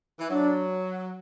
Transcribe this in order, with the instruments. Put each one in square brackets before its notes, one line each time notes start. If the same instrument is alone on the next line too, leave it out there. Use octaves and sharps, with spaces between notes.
[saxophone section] E3
[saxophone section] F#3 [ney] D4